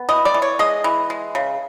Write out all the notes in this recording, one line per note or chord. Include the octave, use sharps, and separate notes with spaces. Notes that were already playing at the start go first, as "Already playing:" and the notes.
Already playing: B3
E3 D#5
D5
E3
C#5
G#3 D#5
E3
G#3
C#3